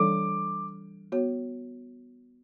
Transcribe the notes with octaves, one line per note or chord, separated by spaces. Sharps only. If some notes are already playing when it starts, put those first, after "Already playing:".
Already playing: E3 G3 D4 A4 D5 D6
B3 F#4 C#5